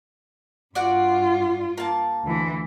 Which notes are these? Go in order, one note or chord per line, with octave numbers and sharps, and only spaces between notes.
G2 F4 F#4 D5
A#3 A5
D2 E3